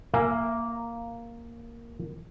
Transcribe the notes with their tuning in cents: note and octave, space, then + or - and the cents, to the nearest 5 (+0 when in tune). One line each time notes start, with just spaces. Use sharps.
A#3 +0 E5 +35 G#5 +0